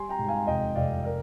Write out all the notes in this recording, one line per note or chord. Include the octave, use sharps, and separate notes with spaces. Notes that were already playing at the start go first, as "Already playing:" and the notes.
Already playing: G3 G#5 C6
G5 A#5
G#2
F5 G#5
F1 D#5 G5
F1 D5 F5
A#4 D5